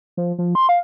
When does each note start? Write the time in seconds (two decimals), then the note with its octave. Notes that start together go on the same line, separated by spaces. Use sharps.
0.17 F3
0.38 F3
0.55 C6
0.69 F5